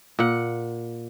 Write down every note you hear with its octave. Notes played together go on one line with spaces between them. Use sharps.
A#2 F#5